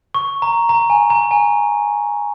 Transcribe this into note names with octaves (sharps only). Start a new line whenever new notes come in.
C#6
A#5
A#5
G#5
A#5
G#5